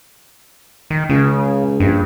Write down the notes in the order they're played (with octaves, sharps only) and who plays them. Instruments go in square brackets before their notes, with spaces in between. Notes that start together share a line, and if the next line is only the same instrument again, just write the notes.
[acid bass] D#3
[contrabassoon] C#2 [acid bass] C#3
[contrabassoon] A#1 [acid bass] G2